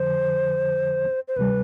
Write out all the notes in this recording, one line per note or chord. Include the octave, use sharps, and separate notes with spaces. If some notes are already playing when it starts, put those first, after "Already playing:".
Already playing: F2 D3 F3 C5
C5
D2 C3 G3 B4